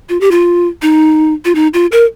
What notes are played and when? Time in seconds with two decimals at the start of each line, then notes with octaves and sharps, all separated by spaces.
0.09 F4
0.21 G4
0.31 F4
0.82 D#4
1.45 F4
1.55 D#4
1.74 F4
1.92 A#4